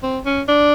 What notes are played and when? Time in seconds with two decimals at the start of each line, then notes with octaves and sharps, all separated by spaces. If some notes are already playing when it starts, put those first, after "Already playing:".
0.03 C4
0.26 C#4
0.49 D4